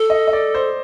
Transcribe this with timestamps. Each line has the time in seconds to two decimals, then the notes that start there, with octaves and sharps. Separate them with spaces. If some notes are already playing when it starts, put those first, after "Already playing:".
Already playing: A4
0.10 D#5
0.28 D#5
0.33 D5
0.55 C5